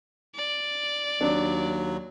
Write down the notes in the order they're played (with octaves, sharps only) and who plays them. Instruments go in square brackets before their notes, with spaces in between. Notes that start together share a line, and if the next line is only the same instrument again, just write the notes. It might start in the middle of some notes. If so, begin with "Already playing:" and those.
[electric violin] D5
[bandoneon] D#2 F#3 [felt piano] D4